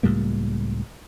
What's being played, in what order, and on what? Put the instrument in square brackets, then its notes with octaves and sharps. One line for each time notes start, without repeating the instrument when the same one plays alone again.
[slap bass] C#2 A2 G3 A#3